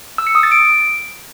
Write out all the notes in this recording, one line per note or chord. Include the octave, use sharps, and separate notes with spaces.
E6
C#7
D#6
A6
D7